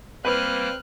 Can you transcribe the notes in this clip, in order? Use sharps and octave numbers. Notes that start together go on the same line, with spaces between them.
G3 A#3 C4 B4 F6 F#6